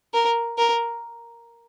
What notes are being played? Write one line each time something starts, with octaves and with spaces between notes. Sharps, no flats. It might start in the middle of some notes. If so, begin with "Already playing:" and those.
A#4
A#4